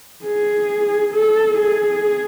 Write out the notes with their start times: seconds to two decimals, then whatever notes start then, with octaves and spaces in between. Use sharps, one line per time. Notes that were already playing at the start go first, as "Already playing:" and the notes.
0.25 G#4
1.14 A4
1.58 G#4